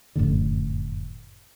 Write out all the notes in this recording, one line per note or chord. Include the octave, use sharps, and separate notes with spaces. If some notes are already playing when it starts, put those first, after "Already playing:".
F1 F#2 A2 D3